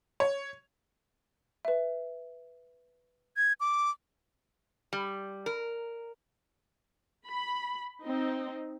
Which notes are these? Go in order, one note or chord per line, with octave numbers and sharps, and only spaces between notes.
C#5
B4 E5
G#6
D6
G3
A#4
B5
C4 D#4